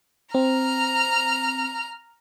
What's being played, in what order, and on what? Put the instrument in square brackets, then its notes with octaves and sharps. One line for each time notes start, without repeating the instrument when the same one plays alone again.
[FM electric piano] C4 [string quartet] A#5 F6